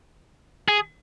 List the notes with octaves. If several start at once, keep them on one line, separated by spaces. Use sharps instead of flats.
G#4